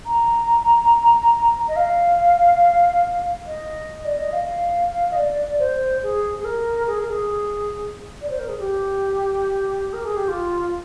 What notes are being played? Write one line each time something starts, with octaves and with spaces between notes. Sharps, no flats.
A#5
D#5
F5
D#5
D5
D#5
F5
D#5
D5
C5
G#4
G#4
A#4
G#4
A#4
G#4
D5
C5
A#4
G#4
G4
A#4
G#4
G4
F4